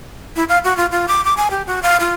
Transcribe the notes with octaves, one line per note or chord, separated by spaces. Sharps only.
E4
F5
F#4
F4
F4
D6
D6
G#5
G4
F#4
F5
F4